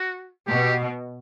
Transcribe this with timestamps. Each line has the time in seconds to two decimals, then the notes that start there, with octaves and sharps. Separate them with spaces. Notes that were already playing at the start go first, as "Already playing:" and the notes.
Already playing: F#4
0.47 B2 G4